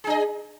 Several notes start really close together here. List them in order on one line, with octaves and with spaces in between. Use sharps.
G#4 D4 D#5